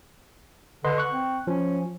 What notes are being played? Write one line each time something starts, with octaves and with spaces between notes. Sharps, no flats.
D3 B4 D#5 C6
C#6 F#6
C4
F3 C#4